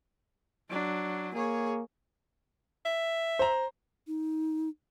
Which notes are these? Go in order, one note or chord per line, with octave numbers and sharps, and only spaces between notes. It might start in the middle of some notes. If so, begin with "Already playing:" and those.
F#3 D4
A#3 G#4 C#5
E5
C5 A#5
D#4